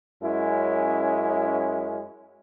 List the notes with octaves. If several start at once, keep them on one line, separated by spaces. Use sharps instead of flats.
F#2 G#3 C#4 E4